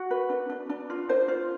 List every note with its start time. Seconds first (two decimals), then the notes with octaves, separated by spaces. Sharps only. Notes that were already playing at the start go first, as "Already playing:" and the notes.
Already playing: F#4
0.11 B4
0.30 D4
0.50 D4
0.69 D4
0.90 F4
1.09 D4 C5
1.28 F4